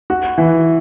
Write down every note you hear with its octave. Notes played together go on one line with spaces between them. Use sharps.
F#4
E3